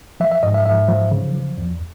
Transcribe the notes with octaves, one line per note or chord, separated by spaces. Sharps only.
F3 E5
E5
G#2 D#5
E5
G#2 E5
F3
C#3
F3
E2